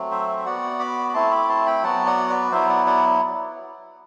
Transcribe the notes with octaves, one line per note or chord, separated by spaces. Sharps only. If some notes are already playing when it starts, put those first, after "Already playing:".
Already playing: F#3 A3 C4
C5 E5
E5
B3 F#4 D5 F#5
B5 D6
B5
A3 C4 E4 A5 C6
B5 D6
A5 C6
G5 B5
F#3 B3 F#4 F#5 A5
D5 F#5
B4 D5
F#3 B3 E4 C5 E5
D5 F#5
D5 F#5